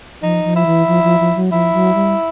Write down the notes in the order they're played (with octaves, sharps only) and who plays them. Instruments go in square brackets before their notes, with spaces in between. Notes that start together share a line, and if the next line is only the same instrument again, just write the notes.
[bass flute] F3 [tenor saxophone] D#4
[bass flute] F3
[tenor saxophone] E4
[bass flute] E3
F3
F3
F3
F#3
[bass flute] F3 [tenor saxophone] E4
[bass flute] F#3
G3